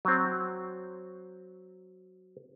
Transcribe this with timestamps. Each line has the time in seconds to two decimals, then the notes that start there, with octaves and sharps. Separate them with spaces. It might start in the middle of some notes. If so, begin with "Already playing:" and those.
0.05 F#3 C4